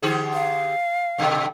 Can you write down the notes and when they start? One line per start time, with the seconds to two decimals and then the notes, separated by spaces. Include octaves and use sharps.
0.02 D3 G4 G#4
0.33 F5
1.18 G2 B2 D3